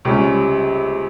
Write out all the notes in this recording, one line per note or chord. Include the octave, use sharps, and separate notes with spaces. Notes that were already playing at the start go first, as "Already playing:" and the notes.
C#2 C3 G3 C#4